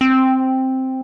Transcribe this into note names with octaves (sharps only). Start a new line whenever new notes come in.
C4